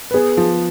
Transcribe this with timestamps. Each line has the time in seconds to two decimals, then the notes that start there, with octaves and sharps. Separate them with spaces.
0.11 B4
0.14 B3 G#4
0.37 F3